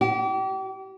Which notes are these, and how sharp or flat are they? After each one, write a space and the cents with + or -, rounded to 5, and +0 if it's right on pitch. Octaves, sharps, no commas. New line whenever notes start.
G4 -35